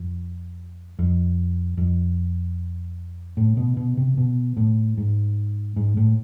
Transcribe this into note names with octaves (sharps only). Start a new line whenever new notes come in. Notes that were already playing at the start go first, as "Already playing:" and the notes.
Already playing: F2
F2
F2
A2
B2
B2
C3
B2
A2
G#2
G#2
A2